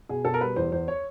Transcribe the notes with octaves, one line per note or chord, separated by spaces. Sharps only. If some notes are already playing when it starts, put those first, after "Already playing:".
B2 G#4
B2 A4
A#4
G3 B4
E2 C5
E2 C5
C#5